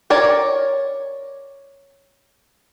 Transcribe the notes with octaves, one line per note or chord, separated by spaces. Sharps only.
A#4 C#5 D5